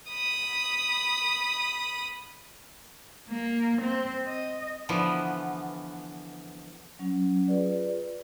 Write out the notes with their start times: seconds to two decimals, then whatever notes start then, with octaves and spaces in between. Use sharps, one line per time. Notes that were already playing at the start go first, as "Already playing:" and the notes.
0.10 B5 D#6
3.30 A#3
3.82 C4
4.27 D#5
4.89 D3 E3 F3 B3
6.99 F#3 C#4
7.48 F4 G#4 B4 D5